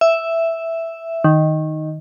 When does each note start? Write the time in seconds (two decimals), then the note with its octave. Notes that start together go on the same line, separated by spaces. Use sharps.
0.01 E5
1.24 D#3